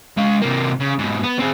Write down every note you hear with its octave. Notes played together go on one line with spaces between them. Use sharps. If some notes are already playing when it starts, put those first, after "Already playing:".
G#3 F5
C3 A#3
C#3
G#2 B2
B3
C4 G#4